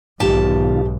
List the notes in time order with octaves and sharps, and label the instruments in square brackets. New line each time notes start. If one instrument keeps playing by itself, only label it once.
[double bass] B1 G#2 [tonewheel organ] B2 D#3 F4 [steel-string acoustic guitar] G4 A5